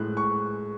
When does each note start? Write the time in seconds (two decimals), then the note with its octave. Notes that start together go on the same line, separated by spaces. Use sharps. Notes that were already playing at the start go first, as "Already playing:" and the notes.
Already playing: A2 G#3 F#6
0.17 C#6